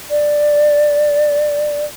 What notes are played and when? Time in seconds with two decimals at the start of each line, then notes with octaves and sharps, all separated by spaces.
0.10 D5